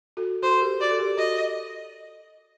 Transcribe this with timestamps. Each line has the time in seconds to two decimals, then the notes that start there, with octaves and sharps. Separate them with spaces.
0.17 F#4 A4
0.42 F#4 A4 C5
0.61 G4 A#4
0.80 F#4 A4 D5
0.91 A4
0.99 G4 A#4
1.18 F#4 A4 D#5